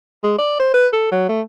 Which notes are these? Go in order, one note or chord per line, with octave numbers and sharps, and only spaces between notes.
G#3
D5
C5
B4
A4
F#3
A3